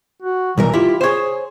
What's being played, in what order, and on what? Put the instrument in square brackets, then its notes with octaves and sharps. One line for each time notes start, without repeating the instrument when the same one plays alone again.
[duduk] F#4
[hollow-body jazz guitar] B1 G3 A#4 [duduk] E3
[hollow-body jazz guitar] E4 G4 [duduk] F4
[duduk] G#4 [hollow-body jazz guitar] C5 C#5